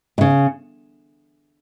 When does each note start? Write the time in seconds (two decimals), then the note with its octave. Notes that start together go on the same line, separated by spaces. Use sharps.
0.18 B2
0.21 C#3